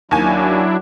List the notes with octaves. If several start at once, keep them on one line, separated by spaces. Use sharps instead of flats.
D#2 F#3 D4 E4 G#5